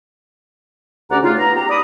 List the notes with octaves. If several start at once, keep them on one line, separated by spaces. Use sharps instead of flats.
D2 C#4 G4 D5 F#5 A#5
C#3 A3 D#4 F4
B3 A#5
G4 A#5
D5 B5 D6 D#6